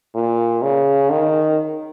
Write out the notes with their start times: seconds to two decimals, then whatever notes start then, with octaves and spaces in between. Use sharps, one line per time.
0.14 A#2
0.62 C#3
1.10 D#3